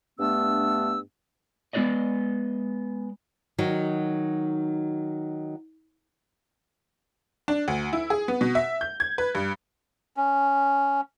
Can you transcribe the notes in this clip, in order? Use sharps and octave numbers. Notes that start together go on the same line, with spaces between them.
G2 A3 B3 D4 E6
G#3 B3 F4 B4 D5 D#5
D#3 F#3 D#4 F#4
D4
D2
E4
G#4
B3
B2
E5
G6
G#6
B4
G2
C#4